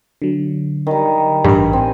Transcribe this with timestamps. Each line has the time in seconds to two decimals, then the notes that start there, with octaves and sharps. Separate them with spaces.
0.22 D3 F#3
0.87 D#3 G3
1.44 A1 G2 A#4
1.73 C4 G#5